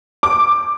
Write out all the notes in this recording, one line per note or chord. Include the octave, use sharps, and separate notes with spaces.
D6